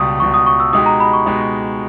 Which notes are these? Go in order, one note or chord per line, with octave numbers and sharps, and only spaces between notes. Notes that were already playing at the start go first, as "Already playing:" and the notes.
Already playing: C#2 B2 G3 C#6 D#6
C#2 B2 G3 C#6
D#6
C#6
E6
B2 G#3 D#4 G4 D#6
A#5
B5
C#6
B2 G#3 D#4 G4